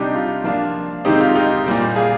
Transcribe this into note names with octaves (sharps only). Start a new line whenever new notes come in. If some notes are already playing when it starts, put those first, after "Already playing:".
Already playing: C3 G3 D4 D#4 G4
F4
F3 A#3 D4 F4
C3 D#3 G#3 C4 D#4 G4
F4
D#4 G4
A#2 G3 A#3
F4 G#4